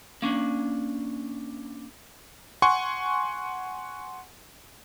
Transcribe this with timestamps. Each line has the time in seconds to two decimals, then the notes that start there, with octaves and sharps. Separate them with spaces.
0.22 A#3 C#4 D4
2.62 F#5 G#5 C6 C#6